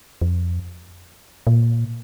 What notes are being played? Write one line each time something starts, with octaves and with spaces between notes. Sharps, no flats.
F2
A#2